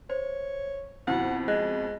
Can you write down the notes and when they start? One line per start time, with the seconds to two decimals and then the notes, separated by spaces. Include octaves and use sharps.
0.10 C5 C#5
1.07 F2 B2 E4 F#5
1.48 G#3 D#5 F#6